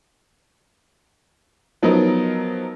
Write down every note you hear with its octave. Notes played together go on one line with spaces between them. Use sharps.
F3 F#3 B3 D#4 A#4 D#5